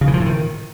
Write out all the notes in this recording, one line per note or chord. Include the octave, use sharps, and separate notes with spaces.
C#3
E3
F3
A2
D#3